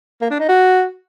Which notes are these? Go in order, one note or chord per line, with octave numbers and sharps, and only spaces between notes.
A#3
D4
D#4
F#4